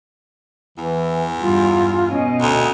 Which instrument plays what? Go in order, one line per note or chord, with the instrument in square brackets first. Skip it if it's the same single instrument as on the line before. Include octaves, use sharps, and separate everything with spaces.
[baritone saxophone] E2 [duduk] E3
[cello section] G2 [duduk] F4
[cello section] B2 D#5 [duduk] C#4
[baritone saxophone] D2 [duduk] C#4